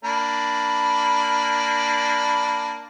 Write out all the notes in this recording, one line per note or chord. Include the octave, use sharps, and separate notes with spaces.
A#3 D4 B5